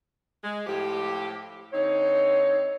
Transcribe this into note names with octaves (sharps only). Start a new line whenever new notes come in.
G#3
A2 F3 G4
D3 C4 D#4 C#5